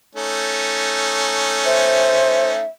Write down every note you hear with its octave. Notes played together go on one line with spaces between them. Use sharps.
A3 C#4 D#4
C5 E5